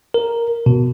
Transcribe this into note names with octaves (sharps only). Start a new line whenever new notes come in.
A#4
B2